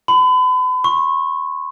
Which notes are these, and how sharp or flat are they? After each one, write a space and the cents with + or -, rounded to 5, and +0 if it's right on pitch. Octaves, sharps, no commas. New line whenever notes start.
B5 +40
C#6 -30